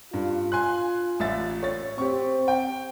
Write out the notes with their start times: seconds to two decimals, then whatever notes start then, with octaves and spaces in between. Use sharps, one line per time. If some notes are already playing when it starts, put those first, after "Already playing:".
0.14 G2 F4
0.52 G#5 C6 F#6
1.20 A1 E5 A6
1.63 C#5 A6
1.98 C4 G4 C#6
2.48 G5